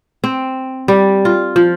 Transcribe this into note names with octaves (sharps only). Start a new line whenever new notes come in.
C4
G3
F4
F3